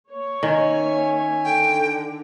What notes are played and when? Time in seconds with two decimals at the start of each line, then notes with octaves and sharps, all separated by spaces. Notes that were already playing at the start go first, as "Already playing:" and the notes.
0.11 A#3 C#5
0.43 D#3 C#4 E5 G#5
1.44 D3 G5